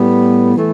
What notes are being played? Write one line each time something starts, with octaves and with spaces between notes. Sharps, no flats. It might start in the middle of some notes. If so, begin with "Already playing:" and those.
Already playing: A2 G3 B3
E3 A3